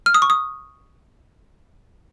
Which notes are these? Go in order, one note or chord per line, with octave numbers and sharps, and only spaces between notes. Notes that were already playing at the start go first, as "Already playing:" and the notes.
F6
D#6
C#6
D#6